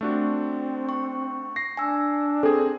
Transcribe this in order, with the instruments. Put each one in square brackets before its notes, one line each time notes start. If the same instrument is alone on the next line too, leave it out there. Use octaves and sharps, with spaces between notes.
[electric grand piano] A3 D4 F#4 [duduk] C4
[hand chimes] C#6
[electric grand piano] A#6 C7
[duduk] D4 [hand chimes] G#5 E6
[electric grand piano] C4 G#4 [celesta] A4